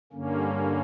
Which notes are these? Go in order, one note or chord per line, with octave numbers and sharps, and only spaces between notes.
G2 D3 A#3 C#4